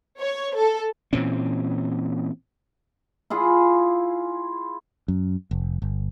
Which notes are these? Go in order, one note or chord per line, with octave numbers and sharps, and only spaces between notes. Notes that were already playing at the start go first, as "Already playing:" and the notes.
C#5
A4
A#2 E3 C4 C#4
E4 F4 G#4
F#2
F1
G1